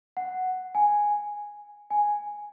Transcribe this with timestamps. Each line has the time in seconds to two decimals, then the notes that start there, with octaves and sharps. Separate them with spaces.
0.17 F#5
0.75 G#5
1.90 G#5